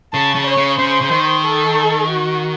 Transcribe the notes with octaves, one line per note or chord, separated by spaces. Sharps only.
C#3 A5
C#3
C#5
C#3
C#3 C5
C#3
D#3
A4
F#4